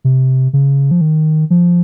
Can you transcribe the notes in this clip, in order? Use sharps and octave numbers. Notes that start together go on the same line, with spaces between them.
C3
C#3
F3
D#3
F3